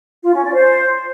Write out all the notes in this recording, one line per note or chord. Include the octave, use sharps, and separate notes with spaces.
F4
C#4
D5
C5